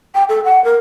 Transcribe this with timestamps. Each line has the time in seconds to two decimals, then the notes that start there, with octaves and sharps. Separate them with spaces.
0.15 G5
0.29 A4
0.45 F#5
0.64 A#4